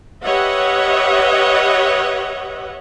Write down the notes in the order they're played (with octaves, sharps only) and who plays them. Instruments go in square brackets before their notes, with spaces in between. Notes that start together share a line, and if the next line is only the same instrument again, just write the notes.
[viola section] G4 B4 C#5 D#5 E5 F#5